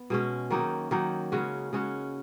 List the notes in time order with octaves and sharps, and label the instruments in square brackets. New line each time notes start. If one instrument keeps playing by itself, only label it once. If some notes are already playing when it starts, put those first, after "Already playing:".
Already playing: [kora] B3
B2 G#3 C#4
D#3 F#3 A#3 D#4
D#3 F#3 A#3 D#4
C#3 G#3 C#4 F#4
C#3 G#3 C#4 F#4